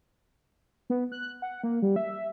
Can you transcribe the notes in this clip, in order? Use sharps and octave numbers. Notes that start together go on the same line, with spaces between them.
B3
F#6
F#5
A#3
G3
E5